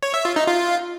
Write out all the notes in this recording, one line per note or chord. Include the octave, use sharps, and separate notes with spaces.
C#5
E5
F4
D#4
F4